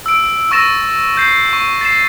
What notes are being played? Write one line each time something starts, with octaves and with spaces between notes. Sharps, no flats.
E6 D7
C#6 E6 A6 A#6 E7
G6 C7
C#6
A6 C7 E7